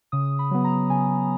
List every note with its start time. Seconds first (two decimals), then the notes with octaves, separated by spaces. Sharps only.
0.12 C#3 D#6
0.39 B5
0.51 F#3 B3
0.64 A#5
0.90 C#3 G#5